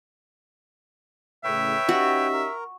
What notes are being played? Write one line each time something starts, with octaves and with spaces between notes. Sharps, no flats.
A2 C#3 B4 C#5 E5 G5
C#4 D#4 F#4 G4
A#4